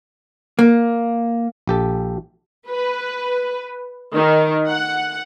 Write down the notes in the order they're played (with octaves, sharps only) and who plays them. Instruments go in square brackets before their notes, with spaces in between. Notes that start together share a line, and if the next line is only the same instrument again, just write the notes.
[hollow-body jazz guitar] A#3
[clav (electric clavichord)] A#1 G4 A4
[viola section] B4
D#3
F#5